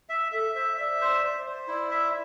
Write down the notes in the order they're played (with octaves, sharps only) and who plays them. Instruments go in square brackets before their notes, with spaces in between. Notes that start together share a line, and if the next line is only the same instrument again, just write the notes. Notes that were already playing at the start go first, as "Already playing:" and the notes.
[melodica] E5
[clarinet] A4 [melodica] E5
[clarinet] C5 [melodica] E5
[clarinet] D5 [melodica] E5
[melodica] C5
C5
C5
[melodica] E4 [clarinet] D5
[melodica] E5